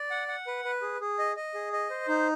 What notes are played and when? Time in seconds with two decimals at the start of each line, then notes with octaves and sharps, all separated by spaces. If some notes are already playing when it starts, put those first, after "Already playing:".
Already playing: D5
0.11 F#5
0.28 F#5
0.47 B4
0.65 B4
0.82 G#4
1.00 G#4
1.19 D#5
1.36 D#5
1.54 G#4
1.73 D#5
1.90 C5
2.08 D#4